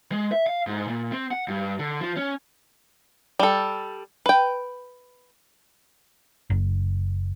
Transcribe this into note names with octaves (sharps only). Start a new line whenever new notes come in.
G#3
E5
F5
G#2
A#2
C4
F#5
G2
D3
F3
C#4
G3 A4
B4 G5
F#1